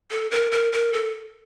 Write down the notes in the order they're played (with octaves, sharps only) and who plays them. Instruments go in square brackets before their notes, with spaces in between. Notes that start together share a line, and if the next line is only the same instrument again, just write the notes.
[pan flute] A4
A#4
A#4
A#4
A4